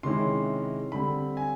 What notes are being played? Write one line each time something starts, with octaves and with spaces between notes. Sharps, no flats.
C3 D#3 G#3 C#4 E4 C6
D3 G3 C4 B5
G#5